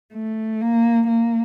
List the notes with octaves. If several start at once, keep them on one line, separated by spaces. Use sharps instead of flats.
A3
A#3
A#3